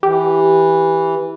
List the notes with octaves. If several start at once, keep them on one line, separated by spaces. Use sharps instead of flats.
E3 G4